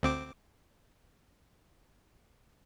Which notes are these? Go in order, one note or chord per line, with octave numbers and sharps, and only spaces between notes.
D2 C4 D6